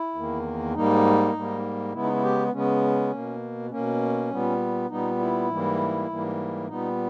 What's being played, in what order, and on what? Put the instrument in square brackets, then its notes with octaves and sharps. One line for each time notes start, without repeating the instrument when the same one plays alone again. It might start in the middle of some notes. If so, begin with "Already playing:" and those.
Already playing: [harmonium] E4
E2 D#3 A#3
G#2 G3 A#3 D#4
G#2 G3 A#3
C#3 G#3 B3 E4
D#4
E4
G4
C#3 G#3 B3 C#4
B2 A#3
B2 A#3 C#4
A#2 G3 B3
A#2 G3 B3 D#4
E4
G#2 E3 G3 A#3
G#2 E3 G3 A#3
A#2 G3 B3 D#4